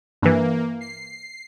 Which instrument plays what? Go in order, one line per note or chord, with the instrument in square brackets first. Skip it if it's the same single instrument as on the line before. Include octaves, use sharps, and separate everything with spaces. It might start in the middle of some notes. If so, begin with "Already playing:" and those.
[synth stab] G2 E3 [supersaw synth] A#3
[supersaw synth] C7